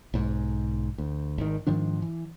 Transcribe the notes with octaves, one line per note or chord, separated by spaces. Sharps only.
B1 G#2
D2
G#1 D#3
G#2 D#3 F3 D4
E3